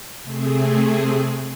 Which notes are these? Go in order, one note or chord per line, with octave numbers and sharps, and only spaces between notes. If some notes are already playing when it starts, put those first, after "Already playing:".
C3 A3 C4 G#4